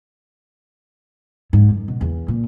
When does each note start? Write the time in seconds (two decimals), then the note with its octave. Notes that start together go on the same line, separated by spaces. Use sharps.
1.53 G#2
1.71 F#2
1.88 B2
2.01 E2
2.28 A#2